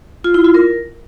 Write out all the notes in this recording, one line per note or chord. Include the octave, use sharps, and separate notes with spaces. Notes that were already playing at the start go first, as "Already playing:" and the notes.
F4
E4
F4
A#4